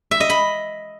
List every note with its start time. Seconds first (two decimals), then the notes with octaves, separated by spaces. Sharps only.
0.11 E5
0.20 D#5
0.30 B5